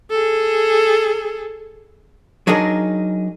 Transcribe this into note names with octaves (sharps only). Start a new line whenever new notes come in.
G#4 A4
F#3 D4 D#4 G#4 A#4